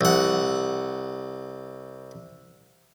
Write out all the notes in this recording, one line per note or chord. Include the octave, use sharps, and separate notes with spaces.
C2 F#5